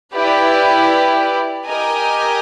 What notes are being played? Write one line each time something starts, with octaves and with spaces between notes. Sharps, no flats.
E4 G4 B4 D5
G4 A#4 D#5 G#5